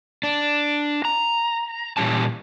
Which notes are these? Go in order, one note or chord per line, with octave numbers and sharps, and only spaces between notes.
D4
A#5
A#2 E3 G3 C#4 A5